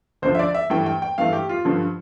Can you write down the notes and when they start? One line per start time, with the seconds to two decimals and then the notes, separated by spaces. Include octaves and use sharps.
0.22 D2 D3 F3 C5
0.35 E5
0.39 D5
0.55 E5
0.70 G2 E3 A3 G5
0.86 G5
1.02 G5
1.18 G2 E3 A3 F5
1.33 G4
1.49 F4
1.65 G2 D3 F3